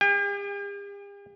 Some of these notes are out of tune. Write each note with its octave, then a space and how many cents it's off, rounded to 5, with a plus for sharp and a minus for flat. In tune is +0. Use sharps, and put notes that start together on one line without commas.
G4 +45 G5 +45